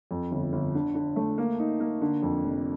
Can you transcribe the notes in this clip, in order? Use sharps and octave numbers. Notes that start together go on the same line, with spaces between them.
F2
G1
G1
D3
D3
A3
A#3
D#4
A#3
D3
F2
F1